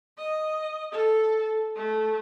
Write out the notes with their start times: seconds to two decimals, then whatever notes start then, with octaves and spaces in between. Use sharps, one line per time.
0.18 D#5
0.92 A4
1.76 A3